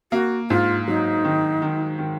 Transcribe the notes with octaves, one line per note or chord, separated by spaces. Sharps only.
A#3 F#4
G#2 F4
F#3 D#4
D#3
D#3
D#3